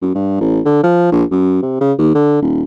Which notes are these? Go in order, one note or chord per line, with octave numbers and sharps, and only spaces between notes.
F#2
G2
A1
D3
F3
A#1
F#2
C3
C#3
D#2
D3
D#1